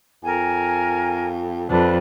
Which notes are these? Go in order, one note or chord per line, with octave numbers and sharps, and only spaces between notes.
F2 A#4 G#5
F2 D4 B4 D5 A5